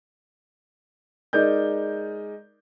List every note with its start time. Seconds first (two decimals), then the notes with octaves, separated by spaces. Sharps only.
1.33 G#3 D#4 A#4 D5 G6